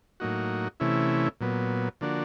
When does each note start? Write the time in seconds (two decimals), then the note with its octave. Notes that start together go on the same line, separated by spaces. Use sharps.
0.20 A2 F#3 A#3 D#4 F#4
0.80 C3 E3 A3 C#4 E4
1.41 A#2 F#3 B3
2.01 D3 F3 A#3 D4 F#4